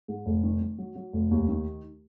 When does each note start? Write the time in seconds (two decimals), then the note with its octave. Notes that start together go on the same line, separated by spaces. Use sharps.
0.08 G#2
0.26 F1
0.43 D#3
0.61 D#3
0.78 F#3
0.96 F#3
1.13 F1
1.31 D#2
1.49 D#3